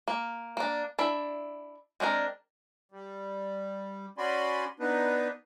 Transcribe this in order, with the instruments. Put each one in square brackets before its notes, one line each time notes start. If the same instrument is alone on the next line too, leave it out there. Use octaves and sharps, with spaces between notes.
[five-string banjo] A#3
A#3 D4
D4 E4 E5
G#3 C4 D4 A#4
[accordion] G3
C#4 F#4 D5 G#5 B5 C6
B3 D4 D#4 B4